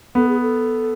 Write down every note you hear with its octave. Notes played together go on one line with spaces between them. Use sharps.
B3 A4
G#4
A4